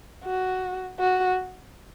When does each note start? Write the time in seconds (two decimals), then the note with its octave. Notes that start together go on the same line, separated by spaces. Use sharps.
0.25 F#4
1.00 F#4